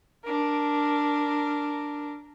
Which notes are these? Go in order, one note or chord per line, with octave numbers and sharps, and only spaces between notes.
D4 A#4